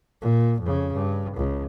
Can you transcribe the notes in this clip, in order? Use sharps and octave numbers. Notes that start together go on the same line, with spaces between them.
A#2
F2 C#3
G2
C#2